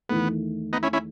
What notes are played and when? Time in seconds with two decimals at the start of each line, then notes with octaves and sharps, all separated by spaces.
0.09 E2 D#3 A3 B3
0.73 B3 D#4
0.83 C#4 E4
0.93 C#4 E4